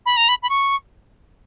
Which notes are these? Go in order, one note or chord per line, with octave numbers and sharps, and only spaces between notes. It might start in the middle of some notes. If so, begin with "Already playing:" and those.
B5
A#5
B5
B5
C#6